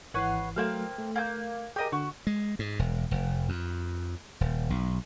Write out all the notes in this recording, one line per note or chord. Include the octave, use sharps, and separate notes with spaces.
G#1 E3 B4 C#5 F#5 C7
F#3 A3 A#3 C4 F5
A3
A#3 G#5 G6
G4 G#4 A#4 D#5
D3 F#4
G#3
G#2
E1
F1
F2
D#1
B1